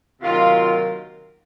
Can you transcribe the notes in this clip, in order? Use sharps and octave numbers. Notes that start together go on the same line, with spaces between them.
C3 D#3 F#3 A#3 F4